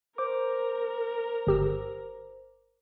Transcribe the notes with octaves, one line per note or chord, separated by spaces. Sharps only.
A#4 C5 D6
G1 G4 E6